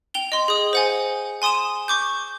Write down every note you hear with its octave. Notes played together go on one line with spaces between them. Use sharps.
G5 F7 G7
D#5 C6
G#4 D#6
C5 F#5 G#5
G#5 C6 D#6 D#7 E7
C#6 D6 G6